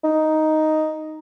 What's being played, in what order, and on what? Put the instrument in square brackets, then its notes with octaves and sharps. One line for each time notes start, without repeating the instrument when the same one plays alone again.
[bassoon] D#4